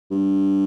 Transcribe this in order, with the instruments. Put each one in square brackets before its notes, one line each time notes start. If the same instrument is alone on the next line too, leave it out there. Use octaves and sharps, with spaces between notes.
[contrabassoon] G2